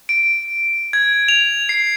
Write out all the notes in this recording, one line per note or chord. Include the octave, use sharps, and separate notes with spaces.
D7
G#6
F7
C7